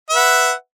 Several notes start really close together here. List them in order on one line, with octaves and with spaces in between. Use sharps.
E5 B4 F#5